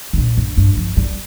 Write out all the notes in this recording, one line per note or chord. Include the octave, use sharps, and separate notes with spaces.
C3
A#2
G2
G2
F3
G3